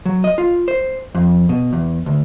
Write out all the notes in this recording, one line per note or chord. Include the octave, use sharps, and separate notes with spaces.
F#3
D#5
F4
C5
F2
B2
E2
D2